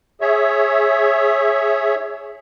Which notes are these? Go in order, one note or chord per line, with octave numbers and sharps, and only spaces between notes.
G#4 C#5 E5